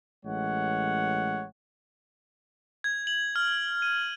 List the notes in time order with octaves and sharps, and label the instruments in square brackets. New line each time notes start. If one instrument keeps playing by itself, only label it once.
[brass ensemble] A1 G#3 C#5 F#5
[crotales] G#6
F#7
F6
D#7